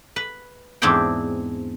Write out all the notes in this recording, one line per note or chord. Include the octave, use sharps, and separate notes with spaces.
B4
E2 G#2 C4 D4 E4 G5